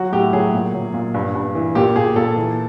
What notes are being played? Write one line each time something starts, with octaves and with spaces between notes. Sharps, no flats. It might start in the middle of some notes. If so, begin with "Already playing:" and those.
Already playing: F#3 F#4
A2 G4
F#3 G#4
A#2
F#3
A#2
G2
G2
E3
A#2 G4
A#2 G#4
A#2 A4
E3